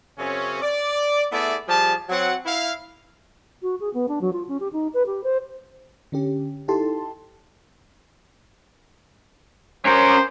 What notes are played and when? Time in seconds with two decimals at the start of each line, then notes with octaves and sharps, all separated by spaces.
0.18 F#2 C#3 C4 C#4
0.62 D5
1.32 A3 B3 E4 G#4 D5 E5
1.67 F3 G3 G4 G#4 A5
2.09 F#3 C4 F#5
2.46 E4 F5
3.62 F#4
3.80 G#4
3.94 B3
4.09 D4
4.21 F#3
4.33 F4
4.48 C#4
4.60 G4
4.73 D#4
4.94 B4
5.06 G4
5.24 C5
6.12 D3 C#4 G4
6.68 D#4 E4 G4 A4 A5 C6
9.85 C#4 A#4 C5